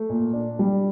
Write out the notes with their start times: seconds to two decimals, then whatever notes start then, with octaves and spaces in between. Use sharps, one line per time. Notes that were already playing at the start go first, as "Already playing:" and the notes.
Already playing: A3
0.10 A#2
0.33 D4
0.59 G3